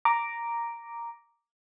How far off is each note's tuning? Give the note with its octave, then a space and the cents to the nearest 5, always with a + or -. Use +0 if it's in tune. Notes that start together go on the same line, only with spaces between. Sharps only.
A#5 +0 D6 +0